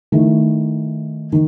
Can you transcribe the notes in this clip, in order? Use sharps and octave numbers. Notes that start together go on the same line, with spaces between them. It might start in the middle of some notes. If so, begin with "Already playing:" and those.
D#3 A3 E4
D#3